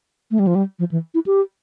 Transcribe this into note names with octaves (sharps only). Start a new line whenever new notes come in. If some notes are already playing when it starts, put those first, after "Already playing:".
A3
G3
F3
G3
F3
E3
E4
G4